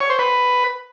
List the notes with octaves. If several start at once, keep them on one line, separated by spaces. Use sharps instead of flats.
C#5
C5
B4